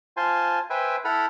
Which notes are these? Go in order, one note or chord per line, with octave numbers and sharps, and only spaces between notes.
F4 C5 G#5 A5 C6
B4 C5 E5 G5 G#5
E4 A4 F#5 B5 F6